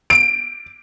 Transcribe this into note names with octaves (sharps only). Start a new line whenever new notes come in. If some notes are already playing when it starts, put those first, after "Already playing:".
D7